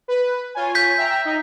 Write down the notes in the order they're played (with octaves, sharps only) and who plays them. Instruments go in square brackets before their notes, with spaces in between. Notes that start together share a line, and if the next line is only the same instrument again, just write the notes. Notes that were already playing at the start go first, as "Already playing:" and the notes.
[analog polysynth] B4
F4 C#5 G#5
[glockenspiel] G6 B6
[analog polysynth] E5 G5 A#5
D#4